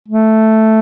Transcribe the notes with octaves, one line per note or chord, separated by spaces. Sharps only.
A3